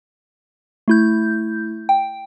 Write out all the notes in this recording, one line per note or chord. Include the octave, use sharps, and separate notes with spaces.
A3 E4 G6
G5